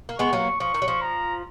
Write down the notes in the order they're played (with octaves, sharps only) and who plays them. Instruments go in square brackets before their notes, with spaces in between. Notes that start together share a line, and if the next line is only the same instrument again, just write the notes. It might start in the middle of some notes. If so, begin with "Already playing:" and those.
[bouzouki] A#3
[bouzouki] G#3 B3 [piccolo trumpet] C#6
[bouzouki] F#3 A#3
[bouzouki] F3 [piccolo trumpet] C#6
[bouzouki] D#3
F#3
F3
[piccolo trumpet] A#5